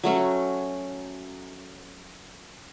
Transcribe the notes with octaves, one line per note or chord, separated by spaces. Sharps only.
F#3 A3 C#4